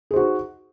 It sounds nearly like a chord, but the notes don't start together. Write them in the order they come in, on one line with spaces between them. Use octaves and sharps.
G#4 C5 F#4 D#4